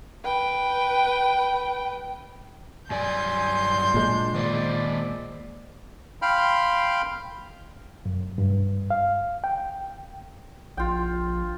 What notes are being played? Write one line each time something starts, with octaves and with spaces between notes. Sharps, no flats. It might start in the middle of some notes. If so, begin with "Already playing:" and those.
B4 G5
G2 F#3 D5 G#5 C6 G6
A#2 G#3 D4
D#3 C5 D5 D#5
F5 G5 B5 C6 F6 G6
F#2
G2
F5
G5
A#1 F4 G5